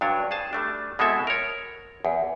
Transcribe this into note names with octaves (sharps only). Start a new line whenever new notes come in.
G2 F#3 D4 C#5
G#4 C5 A5
G3 A3 D4
B2 G#3 C4 E4 A4 E5
A#4 C#5
E2